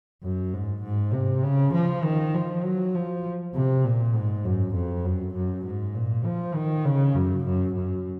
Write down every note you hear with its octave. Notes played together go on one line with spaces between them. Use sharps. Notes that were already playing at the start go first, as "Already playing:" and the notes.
F#2
G#2
G#2
C3
C#3
F3
D#3
F3
F#3
F3
C3
A#2
G#2
F#2
F2
F#2
F#2
G#2
A#2
F3
D#3
C#3
F#2
F#2
F#2